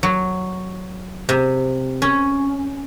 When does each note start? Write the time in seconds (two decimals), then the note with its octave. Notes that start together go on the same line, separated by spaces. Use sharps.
0.03 F#3
1.29 C3
2.02 C#4